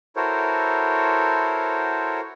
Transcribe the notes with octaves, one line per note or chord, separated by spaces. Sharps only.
E4 F#4 A4 A#4 C5 C#5